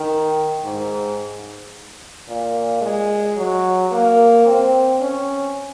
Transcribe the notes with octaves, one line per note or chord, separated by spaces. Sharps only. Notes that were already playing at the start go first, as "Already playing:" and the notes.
Already playing: D#3
G#2
A#2
G#3
F#3
A#3
C4
C#4